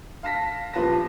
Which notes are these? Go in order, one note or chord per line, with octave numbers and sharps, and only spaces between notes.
F5 A5 A#6 B6
D#1 F3 F4 B4 A5 A#6